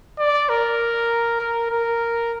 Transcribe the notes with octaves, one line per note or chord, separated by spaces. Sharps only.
D5
A#4
A#4
A#4